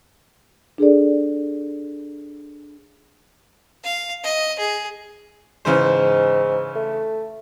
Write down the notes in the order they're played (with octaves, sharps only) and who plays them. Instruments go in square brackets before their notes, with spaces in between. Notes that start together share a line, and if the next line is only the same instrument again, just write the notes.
[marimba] D4 G#4 A4 D5
[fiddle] F5
D#5
G#4
[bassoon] G#2 [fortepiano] C#3 E3 C5
[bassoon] A3